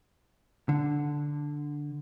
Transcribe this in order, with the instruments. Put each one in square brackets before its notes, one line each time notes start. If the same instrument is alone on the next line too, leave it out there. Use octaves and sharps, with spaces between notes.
[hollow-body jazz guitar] D3